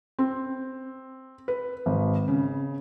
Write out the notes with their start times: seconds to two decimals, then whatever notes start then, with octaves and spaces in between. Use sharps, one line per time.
0.19 C4
1.48 B4
1.86 G#1
2.28 C#3